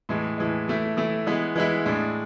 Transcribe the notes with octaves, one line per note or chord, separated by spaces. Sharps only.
A2 E3 G#3
A2 E3 G#3
E3 A3 E4
E3 A3 E4
E3 G#3 B3 E4
E3 G#3 B3 E4
A2 G#3 D4